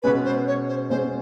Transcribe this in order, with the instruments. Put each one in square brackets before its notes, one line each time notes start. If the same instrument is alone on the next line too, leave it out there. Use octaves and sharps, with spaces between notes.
[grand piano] B2 G#3 C#4 [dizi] B4
[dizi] C5
C#5
C5
[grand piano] B2 G#3 C#4 [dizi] C5